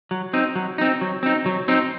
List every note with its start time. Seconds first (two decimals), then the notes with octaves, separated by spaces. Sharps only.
0.11 F#3
0.33 C4 D#4
0.55 F#3
0.78 C4 D#4
1.01 F#3
1.23 C4 D#4
1.46 F#3
1.68 C4 D#4